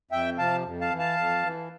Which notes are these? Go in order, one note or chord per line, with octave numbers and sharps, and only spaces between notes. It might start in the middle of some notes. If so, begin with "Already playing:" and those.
F2 E5 G5
C3 F3 F5 A5
F2
F5 A5
E3
F5 A5
F2
E3